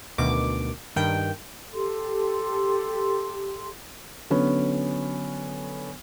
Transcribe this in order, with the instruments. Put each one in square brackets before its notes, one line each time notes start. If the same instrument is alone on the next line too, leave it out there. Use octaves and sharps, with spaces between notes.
[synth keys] D2 B2 D#3 D6
G2 D#3 G3 G5
[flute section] G4 A4 C6
[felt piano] D3 F#3 B3 C#4